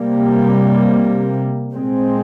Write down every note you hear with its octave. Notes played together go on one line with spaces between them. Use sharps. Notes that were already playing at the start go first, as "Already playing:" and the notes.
Already playing: C3 G3 A#3
A#2 G#3 C4